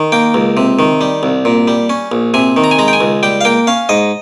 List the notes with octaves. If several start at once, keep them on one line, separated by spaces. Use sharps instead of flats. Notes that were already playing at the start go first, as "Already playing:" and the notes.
Already playing: D#3
A#3 G5
C#2
C3
D#3
G3
C2
A#2
G3
C#4
A#1
C3 G#5
D#3
A#5
G#5
G#3 A#5
G5
G#5
C#2
G3 G5
F5
A#3 G5
C#4 F5
G#2 D#5